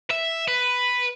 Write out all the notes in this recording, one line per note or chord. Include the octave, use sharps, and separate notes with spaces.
E5
B4